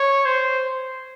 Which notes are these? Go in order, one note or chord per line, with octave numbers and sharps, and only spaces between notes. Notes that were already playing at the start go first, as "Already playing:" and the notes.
Already playing: C#5
C5